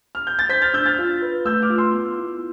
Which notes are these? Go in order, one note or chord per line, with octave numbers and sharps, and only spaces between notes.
F6
G6
A6
C5 G6 B6
F6 A6
D4 E6 G6
F6 A6
F4
B4
A3 E6 G6
D6 F6
F4
C6 E6
B3
E4